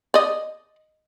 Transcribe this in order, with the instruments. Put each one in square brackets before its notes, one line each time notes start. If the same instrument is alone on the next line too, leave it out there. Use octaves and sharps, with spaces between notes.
[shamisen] D5 D#5